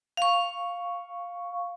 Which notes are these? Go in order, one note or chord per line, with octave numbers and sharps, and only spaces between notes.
F5 C#6